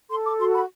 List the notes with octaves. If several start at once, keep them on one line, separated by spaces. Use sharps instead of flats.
A4 C6
D6
F#4 C6
B5